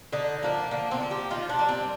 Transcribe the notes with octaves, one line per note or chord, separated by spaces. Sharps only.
D3 D#4
F3 A#3 D4
D3 A#3
C4
F3 A#3
G4
D#3 F4
D4
G3 A#3
C4